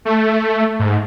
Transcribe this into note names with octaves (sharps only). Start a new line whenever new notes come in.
A3
G#2